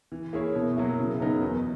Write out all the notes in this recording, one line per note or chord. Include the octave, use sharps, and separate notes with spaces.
E3
A#3 E4 G#4 C#5
B2
F#3 A#3 E4
C#3
F#3 B3 D#4 A#4
E2